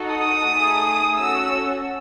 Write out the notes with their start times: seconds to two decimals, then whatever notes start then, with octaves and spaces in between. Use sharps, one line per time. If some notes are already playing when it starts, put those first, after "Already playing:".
Already playing: D#4 F#4 A4
0.13 D#6
0.48 A3 D#4 G#4
1.19 C#4 F#4 A4 E6